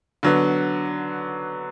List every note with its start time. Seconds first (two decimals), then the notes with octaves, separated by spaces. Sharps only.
0.23 D3 F#3 B3